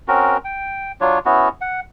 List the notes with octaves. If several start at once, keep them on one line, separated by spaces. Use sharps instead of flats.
C4 C#4 F#4 A#4
G5
F#3 D4 F4 C#5
B3 C#4 E4 F#4
F#5